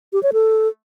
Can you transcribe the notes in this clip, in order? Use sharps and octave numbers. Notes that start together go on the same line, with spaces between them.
G4
C#5
A4